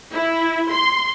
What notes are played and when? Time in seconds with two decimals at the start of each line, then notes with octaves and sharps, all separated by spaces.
0.14 E4
0.71 C6